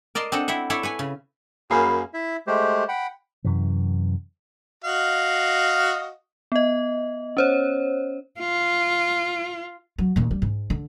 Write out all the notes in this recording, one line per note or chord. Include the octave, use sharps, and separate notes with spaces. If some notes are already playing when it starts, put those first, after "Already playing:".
A#4 D5 D#5 A5 C6
C4 D4 A4 D#5 F#5 A5
C4 E4 E5 F#5
E4 A4 C#5 D5 E5 A5
B4 C#5 G#5
C#3
F#2 A#3 G#4 F5 B5
E4 E5
G#3 A3 G4 C5
F#5 G5 B5
F#2 C3 E3
F#4 D#5 F5
B3 D#5
C#4 C5 C#5
F4
F#3
D#2 A#2
G3
G#2
D3